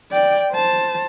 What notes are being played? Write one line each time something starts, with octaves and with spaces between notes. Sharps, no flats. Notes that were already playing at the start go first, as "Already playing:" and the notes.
D5 G5
C5 A5